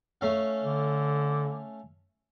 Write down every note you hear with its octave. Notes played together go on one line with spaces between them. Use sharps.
A3 C#4 F5
D3